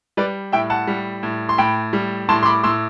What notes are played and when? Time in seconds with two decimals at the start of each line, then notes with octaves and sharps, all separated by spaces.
0.17 G3 B4 D5
0.52 A2 E5 G5
0.70 F#5 A5
0.87 G3
1.23 A2
1.49 C6
1.58 A2 G5 B5
1.93 G3
2.29 A2 A5 C6
2.43 C6
2.45 B5 D6
2.63 A2 C6 E6